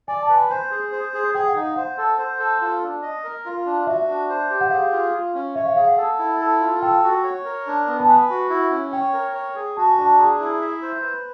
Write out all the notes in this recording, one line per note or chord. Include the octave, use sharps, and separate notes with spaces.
D5 G#5
A5
B4
G#5
C5 G#5
G#4
C5
G#4
G#4 G5
F#5
D#4
F5
C5 F#5
A4
C5
A4
F4
D4
D#5
A#4
F4
D4
F#4 E5
D4
C5
G4
F#5
G#4 F5
F4
F4
C#4
C#5 E5
F5
G#4 F5
F#5
A4
E4
A4
F4
A4 G5
F#4
C#5
A#4
D4
B3
A5
B4 G#5
F#4
E4
C#4
C#5 G5
A#4
C#5
G#4
F#4 A5
G#5
D4 A5
G#4 A#5
E4
E5
C5
B4